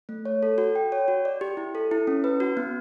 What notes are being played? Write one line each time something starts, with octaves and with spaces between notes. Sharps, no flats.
A3
C#5
A4
F#4
G5
C#5
F#4
D5
G4
E4
A4
E4
C#4
B4
F#4
B3